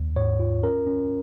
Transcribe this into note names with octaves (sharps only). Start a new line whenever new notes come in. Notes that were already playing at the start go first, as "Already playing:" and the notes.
Already playing: D#2
G#2 C#5
F4
C#4 A#4
C#4